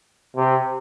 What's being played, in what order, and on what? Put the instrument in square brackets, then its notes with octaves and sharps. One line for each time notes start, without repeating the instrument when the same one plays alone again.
[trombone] C3